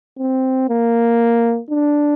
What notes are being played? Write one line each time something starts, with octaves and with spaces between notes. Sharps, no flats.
C4
A#3
D4